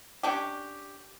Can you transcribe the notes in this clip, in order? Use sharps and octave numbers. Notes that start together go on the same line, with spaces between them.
C#4 D4 G4